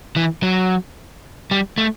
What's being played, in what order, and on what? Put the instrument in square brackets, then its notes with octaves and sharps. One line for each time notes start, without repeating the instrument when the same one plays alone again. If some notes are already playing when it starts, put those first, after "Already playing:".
[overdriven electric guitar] E3
F#3
G3
A3